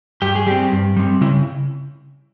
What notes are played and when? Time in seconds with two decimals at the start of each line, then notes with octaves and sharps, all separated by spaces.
0.22 G2 G4
0.35 G#4
0.47 G3 C4 G4
0.72 G2
0.97 G3 C4
1.21 C#3 E4